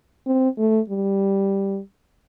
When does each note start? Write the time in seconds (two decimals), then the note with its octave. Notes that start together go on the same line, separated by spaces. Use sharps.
0.26 C4
0.58 A3
0.90 G3